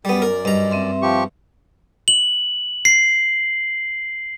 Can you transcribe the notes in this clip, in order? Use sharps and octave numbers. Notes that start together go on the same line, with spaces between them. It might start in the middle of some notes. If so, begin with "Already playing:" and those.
F#2 G3 B3 D5
A#4
G2 D#5 A#5
C4 E5 C6
F3 G4 C#6
F#7
C7